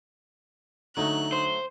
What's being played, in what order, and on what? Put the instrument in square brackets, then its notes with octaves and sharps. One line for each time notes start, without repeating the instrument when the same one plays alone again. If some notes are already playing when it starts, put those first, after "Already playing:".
[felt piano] D3 D#4 [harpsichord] F#3 A3 [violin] F#6
[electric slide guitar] C5